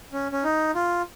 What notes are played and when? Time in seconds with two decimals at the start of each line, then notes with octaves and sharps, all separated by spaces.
0.13 C#4
0.32 C#4
0.44 D#4
0.75 F4